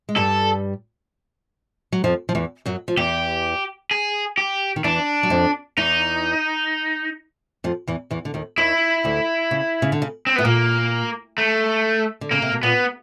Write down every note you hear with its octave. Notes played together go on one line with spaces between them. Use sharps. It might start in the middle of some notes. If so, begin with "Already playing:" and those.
G#3
G2 G3 A4
F#3
F2 F3
F3
E2 E3
F#2 F#3
F3
E2 E3 G4
G#4
G4
D#3
E2 E3 D4
F#3
F2 F3
E2 E3 D#4
F2 F3
E2 E3
E2 E3
D3
D#2 D#3
D#2 D#3 E4
D2 D3
C#3
C#3
D3
C#3
C4
A2 B3
A#2 A#3
A3
D3
C#3 A#3
C3
B2
A#2 B3